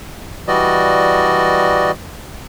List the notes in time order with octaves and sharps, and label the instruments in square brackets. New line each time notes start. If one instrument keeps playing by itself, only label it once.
[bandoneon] E3 G3 F#4 D5 D#5